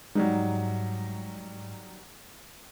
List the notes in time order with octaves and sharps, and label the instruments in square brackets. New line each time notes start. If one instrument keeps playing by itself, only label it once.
[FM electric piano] G#2 [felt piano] F#3 G3 D#4